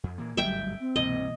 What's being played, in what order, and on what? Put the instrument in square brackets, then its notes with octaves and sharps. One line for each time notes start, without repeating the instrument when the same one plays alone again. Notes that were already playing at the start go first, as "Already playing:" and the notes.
[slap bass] F2
A#2 E3 A#3
[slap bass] G1 D2 G#2 [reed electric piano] F#3 G3 [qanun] E5 G5
[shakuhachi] C4
[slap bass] C2 G2 [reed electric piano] B2 E3 A#3 [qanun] D#5